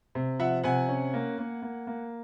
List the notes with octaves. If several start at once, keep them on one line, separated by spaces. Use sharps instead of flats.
C3
F3 E5 F#5
C3 F#5 G#5
C#4
A#3
A#3
A#3
A#3